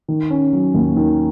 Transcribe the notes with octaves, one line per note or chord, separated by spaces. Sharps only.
D#3
C#4
F#3
D#2
D#3